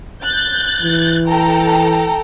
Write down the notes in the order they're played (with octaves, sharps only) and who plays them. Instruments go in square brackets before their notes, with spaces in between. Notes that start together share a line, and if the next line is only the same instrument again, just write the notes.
[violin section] F#6 G6 A6
[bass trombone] E3
[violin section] A4 G5 A#5